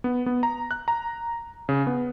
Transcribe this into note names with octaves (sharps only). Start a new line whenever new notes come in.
B3
B3
A#5
F#6
A#5
C#3
B3